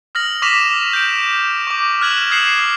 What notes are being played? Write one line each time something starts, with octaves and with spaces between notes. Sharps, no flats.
D#6 F6 A#6 F#7
C#6 D6 A#6 B6 E7 F7
G6 D7
C#6 D6
F6 F#6 G#6 E7 F#7
D#6 G#6 C7 C#7 E7 F#7